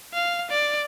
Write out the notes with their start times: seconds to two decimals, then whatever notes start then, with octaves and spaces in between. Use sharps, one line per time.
0.14 F5
0.50 D5